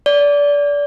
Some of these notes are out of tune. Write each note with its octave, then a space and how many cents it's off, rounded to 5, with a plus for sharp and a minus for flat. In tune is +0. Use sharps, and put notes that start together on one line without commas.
D5 -25